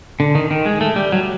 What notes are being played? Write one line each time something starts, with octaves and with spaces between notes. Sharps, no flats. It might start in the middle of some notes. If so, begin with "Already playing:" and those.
D3
D#3
D#3
G#3
A3
G3
F#3